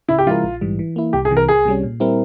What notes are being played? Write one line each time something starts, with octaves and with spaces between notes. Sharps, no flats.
C#3 E4
G4
F3 G#3 E4 F4 A#4
A#1
G#2 E3 G3
E3
A#3 E4
C2 G4
G#4
C3 E3
A#4
C2 G#4
C3 G3 C#4
A#2
G3 C4 E4 A#4